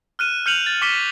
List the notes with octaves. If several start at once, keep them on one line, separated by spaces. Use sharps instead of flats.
F6 F#6 D#7 E7
F6 G6 C#7 D#7 F7 F#7
A6
C#6 D6 B6 C#7 G7